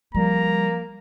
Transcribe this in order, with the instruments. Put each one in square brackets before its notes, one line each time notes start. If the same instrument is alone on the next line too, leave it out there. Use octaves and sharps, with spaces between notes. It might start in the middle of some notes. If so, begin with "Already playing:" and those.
[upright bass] F3 [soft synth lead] G3 [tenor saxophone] A#3 [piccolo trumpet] A#5